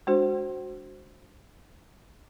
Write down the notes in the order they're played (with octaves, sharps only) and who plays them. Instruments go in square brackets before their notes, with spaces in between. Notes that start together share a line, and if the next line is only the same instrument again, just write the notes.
[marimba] G#3 D4 F#4 C5